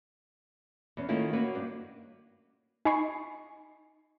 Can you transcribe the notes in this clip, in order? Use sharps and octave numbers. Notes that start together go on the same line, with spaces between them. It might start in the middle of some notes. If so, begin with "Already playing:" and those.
E2 C#4
D#3 A3 A#3 C#4 E4 F4
A#3 C#4 F#4 B4
G2 D4
D#4 G#5 A#5 B5 C#6 C7